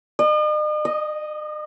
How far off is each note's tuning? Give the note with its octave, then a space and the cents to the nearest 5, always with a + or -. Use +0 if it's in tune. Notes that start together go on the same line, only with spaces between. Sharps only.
D#5 -45
D#5 -5